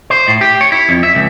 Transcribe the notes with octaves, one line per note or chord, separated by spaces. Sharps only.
C5
A2
G4
C#5
E4
F2
E5
C#2